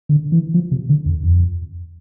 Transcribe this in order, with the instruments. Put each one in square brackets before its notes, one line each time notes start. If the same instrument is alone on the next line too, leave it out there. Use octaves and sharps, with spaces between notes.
[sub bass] D3
E3
F3
C3
D3
E2
F2